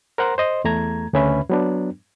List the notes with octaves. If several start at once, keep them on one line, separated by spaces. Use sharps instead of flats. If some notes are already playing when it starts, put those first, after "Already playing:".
A#4 C5 F#5 A#5 C6
C5 D#5 C6
E2 A3 A#5 G#6
D2 C#3 C#4 B4 E5 B5
F#3 B3 D4